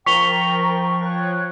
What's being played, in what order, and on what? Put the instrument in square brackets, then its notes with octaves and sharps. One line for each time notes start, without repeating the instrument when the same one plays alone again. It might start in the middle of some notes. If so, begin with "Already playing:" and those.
[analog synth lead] F3 [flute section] A#4 G5 A#5 [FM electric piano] C#6 [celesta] B6 F7 G7
[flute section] C#5 G5 F#6